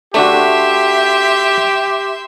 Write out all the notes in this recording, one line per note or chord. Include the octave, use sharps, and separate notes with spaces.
A3 D4 F#4 G4 E5 C6